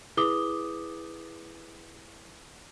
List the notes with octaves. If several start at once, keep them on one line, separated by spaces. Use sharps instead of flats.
E4 G#4 B4 D6 D#6 G7